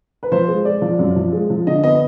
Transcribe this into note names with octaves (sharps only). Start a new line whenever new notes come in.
B4
F3 C5
G#3
G#3 D5
F3
F#2
F3
G#3
F3
D3 D#5
B3 D#5